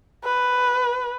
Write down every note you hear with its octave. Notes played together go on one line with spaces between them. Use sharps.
B4